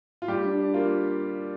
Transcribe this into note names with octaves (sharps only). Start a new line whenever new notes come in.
F4
G3 G4
D4
D4
A#3 F4